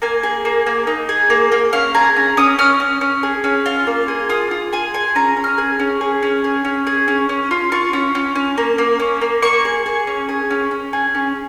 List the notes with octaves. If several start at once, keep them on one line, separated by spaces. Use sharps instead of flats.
A#3 G#5
G#4
A#3
A#3
D#4
G#4
A#3
A#3
C#4 F5
G#4 A#5
C#4
C#4 D#6
C#4 F6
C#4
C#4
G#4
C#4
F4
A#3
G#4
F4 D#6
F4
G#4 G#5
G#4 G#5
C#4 A#5
C#4
F6
G#4
C#4
G#4
C#4
G#4
C#4
G#4
C#4
C#4
F4
F4 C#6
C#4
C#4
C#4
A#3
A#3
C#4
A#3
A#3 C#6
G#4
G#4
C#4
G#4
C#4
C#4
G#4
C#4